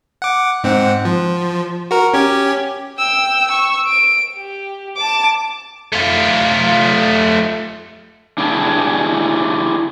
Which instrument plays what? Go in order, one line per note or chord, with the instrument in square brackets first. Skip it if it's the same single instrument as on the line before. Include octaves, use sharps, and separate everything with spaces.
[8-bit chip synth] F#5 D6
G#2 C4 F#5
F3
F#4 A#4
C#4 G4 G#6
[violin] G5 E6
C#6 E6
D7
G4
A5 D6
[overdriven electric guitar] A3 F4
[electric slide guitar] D4 E4 G4 G#4 F#5 A5